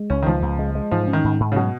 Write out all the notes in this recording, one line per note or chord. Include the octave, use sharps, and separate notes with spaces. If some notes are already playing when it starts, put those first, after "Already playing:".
Already playing: G#3
C#2 C#4
D#3
C#2 F3
C#2
G#3
G#3
G#2 F3
C#4
D#3
G#2
G#2
C#3
B2 F#3